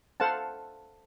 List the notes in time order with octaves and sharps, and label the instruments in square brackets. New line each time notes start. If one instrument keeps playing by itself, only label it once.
[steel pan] A4 C5 F5 F#5 A5